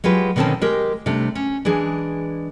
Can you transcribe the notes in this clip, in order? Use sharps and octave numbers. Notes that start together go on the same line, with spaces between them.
F#3 G#3 F4 G4 B4
B2 D3 D#3 C4 C#4 A5
G#3 G4 A#4
C3 G3 A3 D4
C#4
E3 G#3 D4 G#4